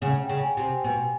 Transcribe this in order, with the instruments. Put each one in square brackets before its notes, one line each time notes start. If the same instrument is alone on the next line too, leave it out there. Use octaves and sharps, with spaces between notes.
[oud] C#3 [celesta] F#5
[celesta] G5
[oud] C#3
[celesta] G#5
[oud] C3
[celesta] G5
[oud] B2 [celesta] G#5